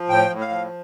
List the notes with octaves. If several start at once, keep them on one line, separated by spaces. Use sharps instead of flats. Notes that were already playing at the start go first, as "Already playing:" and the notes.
Already playing: F3
A2 G5
A2
F5
F3